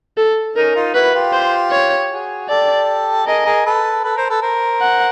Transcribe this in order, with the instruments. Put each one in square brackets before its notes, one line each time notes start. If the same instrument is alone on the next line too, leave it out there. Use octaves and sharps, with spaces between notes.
[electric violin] A4
[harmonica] C#4 D#4 [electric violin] A#4
[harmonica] D#4 F4
[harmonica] E4 F#4 [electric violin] B4
[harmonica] F4 G4
[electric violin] C5
C#5
[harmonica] F#4 G#4
[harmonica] G4 A4 [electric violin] D5
[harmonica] G#4 A#4 [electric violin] D#5
[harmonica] G#4 A#4
A4 B4
A4 B4
A#4 C5
A4 B4
A#4 C5
[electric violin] F#5